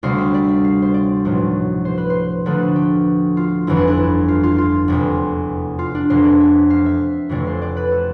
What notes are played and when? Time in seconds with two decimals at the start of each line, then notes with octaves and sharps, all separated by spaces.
0.03 D2 C3 G3 F5
0.18 E5
0.34 D5
0.48 E5
0.64 F5
0.82 C5
0.94 D5
1.25 B1 A2 F3 A3
1.85 C5
1.98 B4
2.10 C5
2.46 D2 D3 F3 A3 B4
2.61 A4
2.76 G4
3.37 F4
3.67 G1 F2 E3 E4
3.77 D4
3.87 D4
3.97 E4
4.28 F4
4.43 F4
4.58 F4
4.88 F1 E2 C3
5.79 F4
5.95 D4
6.10 F1 F2 E3 C5
6.24 D5
6.40 E5
6.70 F5
6.86 E5
7.29 F1 F2 C3 E3 A3 D5
7.47 C5
7.62 D5
7.77 B4
7.92 A4